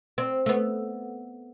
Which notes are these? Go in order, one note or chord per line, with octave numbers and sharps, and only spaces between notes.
C4
A3
B3